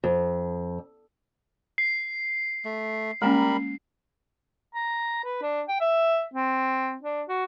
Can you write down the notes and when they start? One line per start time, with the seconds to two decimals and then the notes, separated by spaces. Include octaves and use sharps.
0.04 F2
1.78 C7
2.65 A3
3.22 G3 G#3 A#3 C#4 A#4 B5
4.75 A#5
5.24 B4
5.42 D4
5.68 G5
5.81 E5
6.34 C4
7.03 D4
7.29 F#4